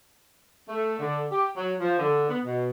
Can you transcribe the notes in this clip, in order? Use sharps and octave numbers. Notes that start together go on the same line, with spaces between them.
A3
D3
G4
F#3
F3
D3
B3
B2